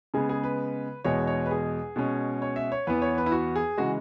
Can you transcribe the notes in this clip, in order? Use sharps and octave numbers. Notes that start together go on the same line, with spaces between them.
C#3 G#3 B3 G#4
G#4
B4
E2 B2 G#3 C#5
C#5
B4
G#4
B2 G#3 C#4
C#5
E5
C#5
E2 E3 B3 B4
C#5
B4
E4
F#4
G#4
C#3 E3 G#3 F#4